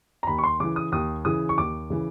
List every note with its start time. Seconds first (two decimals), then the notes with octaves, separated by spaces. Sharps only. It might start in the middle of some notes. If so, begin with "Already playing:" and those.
0.23 A#5
0.27 D#2 B5
0.38 C#6
0.44 C6
0.60 C#3 E3 D6
0.76 D#6
0.92 D#2 D#6
1.25 C#3 E3 D#6
1.49 C#6
1.58 D#2 D6
1.90 C#3 E3